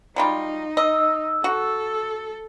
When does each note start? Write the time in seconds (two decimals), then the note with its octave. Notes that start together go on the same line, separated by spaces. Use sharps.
0.16 F#3 G3 D#4 F4
0.77 D#5 E6
1.44 F#4 A4